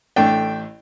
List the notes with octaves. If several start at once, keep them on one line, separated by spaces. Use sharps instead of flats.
A1 A3 D4 G5